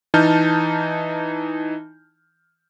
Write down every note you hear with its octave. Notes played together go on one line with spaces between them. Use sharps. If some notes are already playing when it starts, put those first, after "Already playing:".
E3 D#4 A5 F6 G6